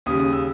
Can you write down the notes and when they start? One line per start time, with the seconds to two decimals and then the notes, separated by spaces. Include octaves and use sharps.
0.06 D#2 C#3 G3 D#6
0.19 D#6
0.33 E6